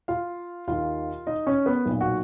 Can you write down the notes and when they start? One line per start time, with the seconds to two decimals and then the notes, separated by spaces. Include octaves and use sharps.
0.08 F4 F5
0.67 D#2 D#3 F4 F5
1.27 D#4 D#5
1.47 C#4 C#5
1.66 B3 B4
1.86 B1
1.91 A#2
2.01 F#4 F#5